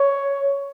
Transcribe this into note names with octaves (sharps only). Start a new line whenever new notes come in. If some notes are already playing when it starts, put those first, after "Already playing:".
Already playing: C#5